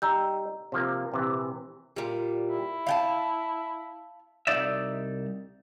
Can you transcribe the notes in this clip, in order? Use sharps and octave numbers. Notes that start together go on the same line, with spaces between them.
G3 D#4 A#5 E6 G6
C3 F3 A#3
A#1 C3 E3
A#2 G3
E4
F5 G5 A5
C2 F#2 D#4 D5 E5